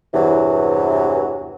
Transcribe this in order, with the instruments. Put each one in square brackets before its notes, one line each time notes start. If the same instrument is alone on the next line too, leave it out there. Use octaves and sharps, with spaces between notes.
[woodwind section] E2 G2 C3 E3 F#3